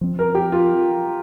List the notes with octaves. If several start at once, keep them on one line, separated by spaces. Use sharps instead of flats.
F3 C4
A#4
G4
F4